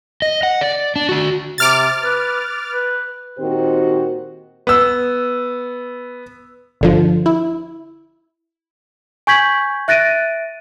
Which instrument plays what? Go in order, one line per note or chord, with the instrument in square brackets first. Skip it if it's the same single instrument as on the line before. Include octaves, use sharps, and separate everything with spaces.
[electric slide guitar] D#5
F#5
D5
D4
F#4 D5
[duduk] C3 [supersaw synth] D6 F6 A6
[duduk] B4
B4
[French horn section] A#2 D#3 C4 F#4 G4 C5
[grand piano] B3 E6
[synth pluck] G1 D3 F3
E4
[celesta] G#5 C#6 G6 G#6 B6 F#7
E5 F#6 A6 A#6 D7 D#7